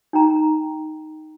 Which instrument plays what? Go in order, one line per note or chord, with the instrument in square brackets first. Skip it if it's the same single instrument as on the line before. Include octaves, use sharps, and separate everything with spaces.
[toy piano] D#4 G5 A#5